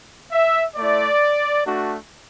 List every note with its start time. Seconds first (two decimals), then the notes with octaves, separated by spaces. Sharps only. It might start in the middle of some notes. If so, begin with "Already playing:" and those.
0.32 E5
0.76 A3 E4 D5
1.64 A3 D4 F#4